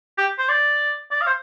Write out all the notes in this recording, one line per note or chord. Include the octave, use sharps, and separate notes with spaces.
G4
C5
D5
D5
F5
C5